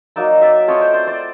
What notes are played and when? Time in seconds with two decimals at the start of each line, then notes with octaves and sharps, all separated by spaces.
0.16 F#3 A#3 D#4 D5 E5
0.42 D5 E5
0.68 A3 C4 F4 C#5 D#5
0.81 C5 D5
0.93 C5 D5
1.07 C5 D5